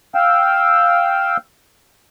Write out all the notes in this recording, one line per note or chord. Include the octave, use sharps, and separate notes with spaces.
F5 G5 E6